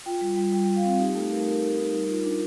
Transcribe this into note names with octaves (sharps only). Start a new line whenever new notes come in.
F4 G5
G3
G3
G3 G5
G3
F5
C4
D#4 G4
A3 A4
D#4 A#4
A3 A#4
A3
D#4
G3
F4
D4